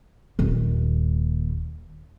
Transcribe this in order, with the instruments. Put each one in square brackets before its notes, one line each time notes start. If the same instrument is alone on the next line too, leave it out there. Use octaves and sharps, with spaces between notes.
[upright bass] D#1 D#2